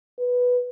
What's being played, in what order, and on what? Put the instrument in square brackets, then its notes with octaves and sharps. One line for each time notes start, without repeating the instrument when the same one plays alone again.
[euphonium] B4